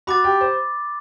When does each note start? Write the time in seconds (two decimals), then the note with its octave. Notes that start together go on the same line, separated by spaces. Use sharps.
0.07 F#4 B5 D6 A6
0.24 G4
0.41 C5